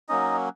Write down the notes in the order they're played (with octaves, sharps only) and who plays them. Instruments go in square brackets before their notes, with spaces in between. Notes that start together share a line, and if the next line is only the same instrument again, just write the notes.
[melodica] F#3 A#3 C#4 D#4 D#5